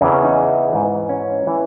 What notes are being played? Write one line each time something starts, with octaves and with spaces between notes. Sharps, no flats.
E2 C#3 E3 C#4
C#4
D#4
G#2 E3
C#4
E3